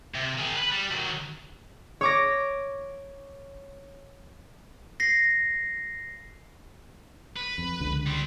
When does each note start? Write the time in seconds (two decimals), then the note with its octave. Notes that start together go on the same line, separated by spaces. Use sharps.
0.15 C3
0.38 D#3 G#4
0.57 B4 B5
0.72 G3
0.91 D#3 F#3
2.01 C#5 D6 A#6
5.00 A#6 C7
7.36 B4
7.58 F2
7.80 C#2 D3
8.06 G3 C4